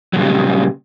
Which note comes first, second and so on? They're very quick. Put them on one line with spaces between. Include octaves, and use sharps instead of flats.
F#3 A#2 G3 C#3